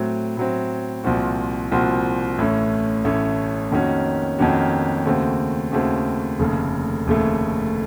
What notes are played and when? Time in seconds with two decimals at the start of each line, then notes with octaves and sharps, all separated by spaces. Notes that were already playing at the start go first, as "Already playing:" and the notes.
Already playing: A2 F#3 C4
0.37 A2 F#3 C4
1.04 C2 A#2 F3 C4 F#4
1.72 C2 A#2 F3 C4 F#4
2.38 A1 A2 A3 C#4
3.04 A1 A2 A3 C#4
3.71 F2 D#3 A#3 C#4 F#4
4.39 F2 D#3 A#3 C#4 F#4
5.05 D#2 C#3 A3 C4 F#4
5.72 D#2 C#3 A3 C4 F#4
6.39 F1 D#2 C#3 A3
7.07 F1 D#2 C#3 A3